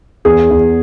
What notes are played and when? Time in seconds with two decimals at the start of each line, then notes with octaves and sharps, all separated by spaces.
0.25 E2 G#4
0.51 E2